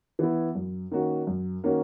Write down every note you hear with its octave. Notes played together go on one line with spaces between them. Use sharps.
E3 B3 E4
F#2
D#3 A#3 C#4 F#4
F#2
D#3 A#3 C#4 F#4